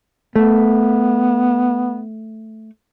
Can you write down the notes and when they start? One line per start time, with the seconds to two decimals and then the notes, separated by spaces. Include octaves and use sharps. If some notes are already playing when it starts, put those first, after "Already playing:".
0.36 A3 B3